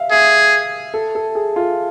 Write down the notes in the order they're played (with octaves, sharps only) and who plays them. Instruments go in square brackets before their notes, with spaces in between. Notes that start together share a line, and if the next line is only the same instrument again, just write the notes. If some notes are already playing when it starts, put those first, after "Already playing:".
Already playing: [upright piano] E5 F5
[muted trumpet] G#4 [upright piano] E5
[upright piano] A4
A4
G#4
F4